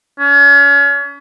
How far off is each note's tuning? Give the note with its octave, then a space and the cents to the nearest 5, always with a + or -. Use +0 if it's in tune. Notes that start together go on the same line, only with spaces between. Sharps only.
C#4 +35